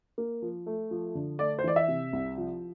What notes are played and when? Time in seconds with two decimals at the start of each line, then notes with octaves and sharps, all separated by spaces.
0.18 A#3
0.42 F3
0.66 A3
0.91 F3
1.15 D3
1.39 A3 D5
1.59 C5
1.64 E3 D5
1.76 E5
1.88 C3
2.13 C2
2.38 F3